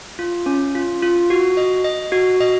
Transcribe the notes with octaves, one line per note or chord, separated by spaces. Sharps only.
F4
C#4
F4
F4
F#4
D#5
D#5
F#4
D#5